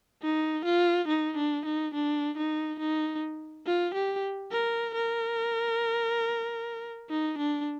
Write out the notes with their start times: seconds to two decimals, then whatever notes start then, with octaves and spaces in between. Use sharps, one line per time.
0.22 D#4
0.65 F4
1.08 D#4
1.37 D4
1.65 D#4
1.94 D4
2.37 D#4
2.80 D#4
3.66 F4
3.95 G4
4.52 A#4
4.95 A#4
7.10 D#4
7.38 D4